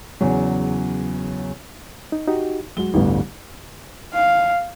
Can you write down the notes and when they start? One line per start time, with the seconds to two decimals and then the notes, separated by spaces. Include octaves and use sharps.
0.21 E2 C#3 F#3
2.12 D#4
2.27 D#4 F#4 G4
2.77 F#3 G#3 F#4 G7
2.94 A1 D2 G2 E3 G3 B3
4.13 F5